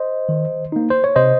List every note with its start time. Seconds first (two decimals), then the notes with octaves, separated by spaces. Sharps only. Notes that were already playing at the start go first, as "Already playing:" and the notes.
Already playing: C5 D#5
0.29 D#3
0.72 A#3 D#4
0.90 C5
1.04 C#5
1.16 C3 C5 D#5